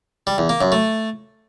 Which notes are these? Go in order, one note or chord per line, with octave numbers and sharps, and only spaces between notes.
G3
E2
A#3
F#2
A3